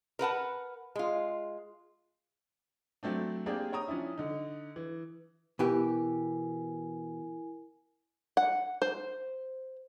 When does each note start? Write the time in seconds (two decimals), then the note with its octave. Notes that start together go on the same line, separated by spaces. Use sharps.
0.19 A#4 B4 F#5 A5
0.95 G#3 F4
3.03 F#3 A3 C4 D4
3.46 A#3 C4 D4 G4 G#4 D5
3.72 C#5 G5 A#5 D#6
3.88 F3 C#4 D4 E4
4.17 D3 D#4
4.76 E3
5.59 B2 E3 E4 G4 A#4 G#5
8.37 F#5
8.82 C5